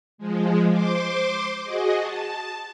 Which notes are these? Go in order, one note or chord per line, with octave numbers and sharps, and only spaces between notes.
F3 G#3
C5 C6 D6
F#4 G#4 D#5
A5